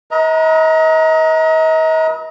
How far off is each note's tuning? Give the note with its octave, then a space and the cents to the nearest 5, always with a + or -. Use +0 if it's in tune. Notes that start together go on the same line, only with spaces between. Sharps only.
B4 -40 D#5 +40 A#5 +0